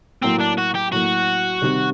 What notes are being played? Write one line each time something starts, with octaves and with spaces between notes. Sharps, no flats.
A2 F#3 A#3 C4
D4
F#4
G4
A2 F#3 A#3 F#4
C3 D#3 G3